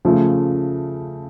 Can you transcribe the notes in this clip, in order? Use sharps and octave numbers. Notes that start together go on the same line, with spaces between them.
C#3 F3 A3